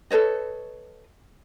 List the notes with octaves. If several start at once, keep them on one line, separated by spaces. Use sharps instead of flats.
A4 B4 C#5 D#5